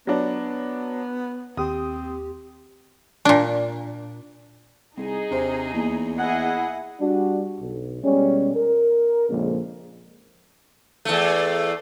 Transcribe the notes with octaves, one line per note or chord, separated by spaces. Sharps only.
F#3 B3 D4
D#2 C4 G4 D#6
A#2 D4
C2 D#4 G#4
D#2 C3 C5
E2 A#3
E4 G#4 D#5 F#5
G3 D4 F#4
B1
B2 G3 G#3 C#4
A#4
A#1 F2 A#2 C#3 G#3 A#3
E2 A3